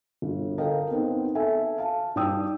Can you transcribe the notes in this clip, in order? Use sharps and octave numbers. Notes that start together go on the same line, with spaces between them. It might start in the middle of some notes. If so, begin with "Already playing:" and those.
G1
A4 A#4 D#5 F5 G5
B3 C4 D#4
A4 E5 G#5
F5 A5
G2 D#4 D5 G5 D#6 E6